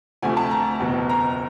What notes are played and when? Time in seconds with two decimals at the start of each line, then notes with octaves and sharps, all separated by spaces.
0.22 D2 C3 F3 A3 G#5
0.37 A5
0.51 A#5
0.80 F#1 E2 B2
1.09 A#5